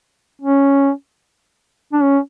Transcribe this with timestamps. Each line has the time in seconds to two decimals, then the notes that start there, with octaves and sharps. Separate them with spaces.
0.42 C#4
1.93 D4
2.02 C#4